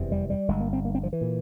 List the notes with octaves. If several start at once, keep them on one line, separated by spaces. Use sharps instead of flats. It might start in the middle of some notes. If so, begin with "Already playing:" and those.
Already playing: F1 E2 C3
G3
G3
G1 G2 G#3
A#3
C4
A#3
C4
F3
E3
A#2